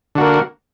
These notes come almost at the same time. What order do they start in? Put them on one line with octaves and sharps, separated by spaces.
D3 F#4 A#3